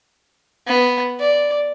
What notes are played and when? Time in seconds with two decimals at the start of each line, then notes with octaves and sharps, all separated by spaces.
0.67 B3
1.20 D5